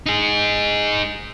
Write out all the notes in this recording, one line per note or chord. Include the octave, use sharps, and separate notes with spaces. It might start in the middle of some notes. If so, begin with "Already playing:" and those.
D#4 G#4